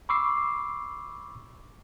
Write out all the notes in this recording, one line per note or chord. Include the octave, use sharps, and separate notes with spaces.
B5 C#6 D6 E6 C7